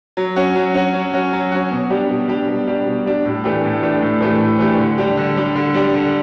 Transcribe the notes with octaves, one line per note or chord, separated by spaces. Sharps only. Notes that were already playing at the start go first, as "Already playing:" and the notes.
F#3
C#4 F#4
F#3
C#4 F#4
F#3
C#4 F#4
F#3
C#4 F#4
B2
G3 D4 G4
B2
G3 D4 G4
B2
G3 D4 G4
B2
G3 D4 G4
A2
E3 A3 D4 G4
A2
E3 A3 D4 G4
A2
E3 A3 D4 G4
A2
E3 A3 D4 G4
D3
G3 D4 G4
D3
G3 D4 G4
D3
G3 D4 G4
D3